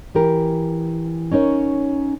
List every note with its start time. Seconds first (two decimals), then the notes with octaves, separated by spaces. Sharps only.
0.15 E3 G4 A#4
1.32 C#4 D#4 A#4 C#5